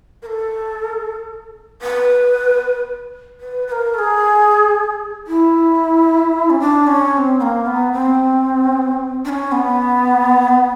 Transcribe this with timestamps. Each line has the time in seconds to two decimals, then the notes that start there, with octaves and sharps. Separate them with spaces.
0.22 A#4
0.26 A4
1.82 B4
3.40 B4
3.67 B4
3.72 A#4
3.94 A4
3.99 G#4
5.27 E4
6.50 C#4
6.60 D4
6.87 C#4
7.13 C#4
7.17 C4
7.39 B3
7.42 A#3
7.66 B3
7.92 C4
9.25 D4
9.29 C#4
9.52 B3